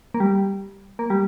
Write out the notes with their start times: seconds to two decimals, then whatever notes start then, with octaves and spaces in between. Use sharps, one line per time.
0.14 A#3
0.20 G3
0.99 A#3
1.10 G3